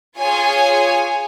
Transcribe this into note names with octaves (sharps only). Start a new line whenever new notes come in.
F4 G#4 C#5 G#5